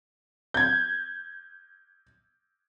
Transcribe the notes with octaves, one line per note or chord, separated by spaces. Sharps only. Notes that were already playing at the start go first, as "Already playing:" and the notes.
G6 G#6